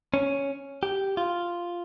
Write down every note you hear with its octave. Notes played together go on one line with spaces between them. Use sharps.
C#4
G4
F4